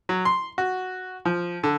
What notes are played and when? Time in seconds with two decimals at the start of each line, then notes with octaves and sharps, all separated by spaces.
0.09 F#3
0.25 C6
0.58 F#4
1.25 F3
1.64 D3